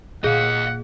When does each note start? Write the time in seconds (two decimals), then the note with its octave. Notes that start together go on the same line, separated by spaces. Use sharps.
0.24 A#2 G#4 D#5 F5 F#5